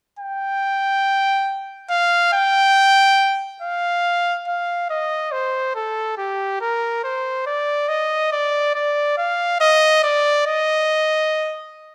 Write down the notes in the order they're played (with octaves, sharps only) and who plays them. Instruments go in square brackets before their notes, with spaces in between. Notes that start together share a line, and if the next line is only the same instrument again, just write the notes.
[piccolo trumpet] G5
F5
G5
F5
F5
D#5
C5
A4
G4
A#4
C5
D5
D#5
D5
D5
F5
D#5
D5
D#5